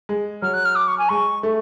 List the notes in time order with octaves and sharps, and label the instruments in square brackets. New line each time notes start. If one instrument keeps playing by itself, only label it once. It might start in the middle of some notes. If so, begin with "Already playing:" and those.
[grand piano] G#3
[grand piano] F#3 [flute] F6
[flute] F#6
F6
D6
C#6
G#5
[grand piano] G#3 [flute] C#6
[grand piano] A3